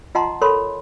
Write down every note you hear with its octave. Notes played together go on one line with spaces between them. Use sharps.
F4 D#5 F#5 A5 A#5 C6
A4 A#4 C#5 B5 C6